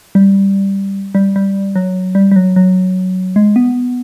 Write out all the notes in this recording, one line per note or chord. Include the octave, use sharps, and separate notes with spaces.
G3
G3
G3
F#3
G3
G3
F#3
F#3
G#3
B3